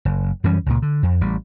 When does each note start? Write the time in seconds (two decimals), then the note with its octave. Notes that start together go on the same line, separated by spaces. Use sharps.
0.05 F#1
0.44 F#2 E3 G3 C#4
0.66 C#2 A#2
0.82 D3
1.03 F2
1.21 A1 G3